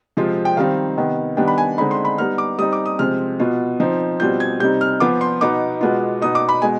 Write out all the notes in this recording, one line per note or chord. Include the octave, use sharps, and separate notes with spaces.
C3 F3 G#3 C4 F4
G5
D#3 G3 C4 D#4 F5
C3 D#3 B3
D#3 G3 B3 D4 G5
B5
G#5
D3 G#3 C4 D#4 B5
C6
B5
G3 B3 D#4 F6
D6
G3 C4 D#4 D#6
D6
D#6
C3 F3 G#3 C4 F6
B2 B3 F4
F3 C4 D#4
B2 G3 C4 F4 G6
G#6
C3 G3 C4 D#4 G6
F6
F3 B3 F4 D6
C6
B2 B3 D#4 D6
B2 G#3 B3 F4
B2 B3 D#4 D#6
D6
B5
B2 G#3 G#5